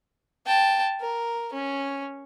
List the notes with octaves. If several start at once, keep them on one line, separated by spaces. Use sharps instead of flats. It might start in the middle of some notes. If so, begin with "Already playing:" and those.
G5 A5
A#4
C#4